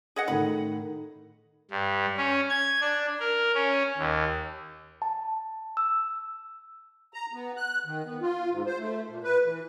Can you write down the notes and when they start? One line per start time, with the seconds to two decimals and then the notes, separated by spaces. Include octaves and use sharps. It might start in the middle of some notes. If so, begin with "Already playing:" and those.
0.16 G#4 D#5 F#5
0.28 A2 D#3 B5
1.71 G2
2.17 C#4
2.50 G#6
2.81 D4
3.20 A#4
3.55 C#4
3.98 D#2
5.02 A5
5.77 E6
7.14 A#5
7.33 B3
7.57 F#6
7.86 D#3
8.06 B3
8.21 F4
8.51 G#2
8.66 C5
8.79 A3
9.09 A#2
9.24 B4
9.45 E3